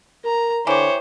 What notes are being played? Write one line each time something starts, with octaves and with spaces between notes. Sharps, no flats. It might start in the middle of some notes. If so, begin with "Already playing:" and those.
A#4 A#5
D3 E3 G4 C5 C#5